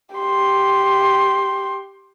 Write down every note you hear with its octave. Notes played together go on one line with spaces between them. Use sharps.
G4 C6